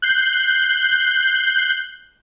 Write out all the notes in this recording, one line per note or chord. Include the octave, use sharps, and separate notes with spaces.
F#6 G6 C7